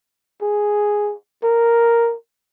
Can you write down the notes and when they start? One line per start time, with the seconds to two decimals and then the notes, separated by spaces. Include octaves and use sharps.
0.42 G#4
1.44 A#4